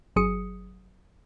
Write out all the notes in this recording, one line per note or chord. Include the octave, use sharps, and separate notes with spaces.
G1 F#3 G#4 D#6 C#7